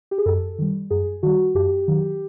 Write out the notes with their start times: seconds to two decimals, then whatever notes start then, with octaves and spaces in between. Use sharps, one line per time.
0.11 G4
0.18 G#4
0.26 F#2 A4
0.59 D#3 G3
0.91 F#2 G#4
1.23 D#3 G3 F#4
1.55 F#2 G4
1.88 D#3 F#3